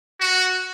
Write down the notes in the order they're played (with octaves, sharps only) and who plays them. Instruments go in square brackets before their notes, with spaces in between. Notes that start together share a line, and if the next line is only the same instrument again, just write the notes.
[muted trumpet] F#4